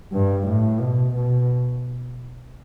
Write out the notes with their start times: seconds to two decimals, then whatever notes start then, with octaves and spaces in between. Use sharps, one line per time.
0.12 G2
0.47 A2
0.80 B2
1.15 B2